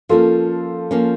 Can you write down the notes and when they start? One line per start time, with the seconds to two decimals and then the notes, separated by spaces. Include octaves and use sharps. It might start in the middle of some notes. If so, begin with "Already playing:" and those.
0.09 F3 A#3 C#4 F4 A4
0.91 F3 A#3 C#4